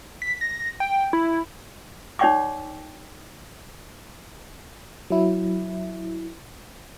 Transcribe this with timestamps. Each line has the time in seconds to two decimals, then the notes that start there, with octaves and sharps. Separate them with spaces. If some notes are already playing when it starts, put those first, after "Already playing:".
0.22 B6
0.41 A#6
0.80 G5
1.13 E4
2.19 D#4 C#5 D5 G5 C#6 D6
5.10 F#3 E4